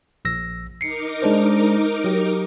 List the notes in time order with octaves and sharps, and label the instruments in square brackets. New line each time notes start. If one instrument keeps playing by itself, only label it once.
[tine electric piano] A#1 E6 A#6
[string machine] D#4 A#4 D6 [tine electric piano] C7 C#7
[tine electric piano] G#3 D4 C5
F#3 G4